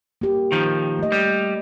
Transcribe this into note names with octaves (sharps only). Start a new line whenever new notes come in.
A#3 G4
D#3 F3
A3 D#5
G3